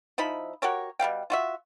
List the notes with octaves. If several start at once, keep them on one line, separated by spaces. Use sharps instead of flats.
F3 D#4 E4 B5
F#4 G4 A#4 C#5
B2 G3 F5 G5
F4 F#4 E5